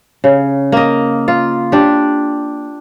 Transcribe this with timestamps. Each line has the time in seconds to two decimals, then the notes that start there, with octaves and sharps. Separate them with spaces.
0.24 C#3
0.72 A#3 D#5
1.28 F4
1.72 D4 G4